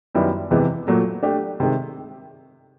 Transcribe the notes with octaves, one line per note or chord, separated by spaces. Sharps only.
F#2 D#3 G3 B3 E4
E2 C3 E3 G#3 B3
A#2 F#3 A3
A3 D4 G4
C3 D#3 G#3